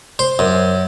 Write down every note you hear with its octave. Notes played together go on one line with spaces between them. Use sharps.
C5
F#2